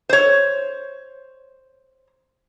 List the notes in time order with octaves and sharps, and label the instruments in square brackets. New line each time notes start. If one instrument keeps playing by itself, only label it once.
[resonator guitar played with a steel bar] C5 C#5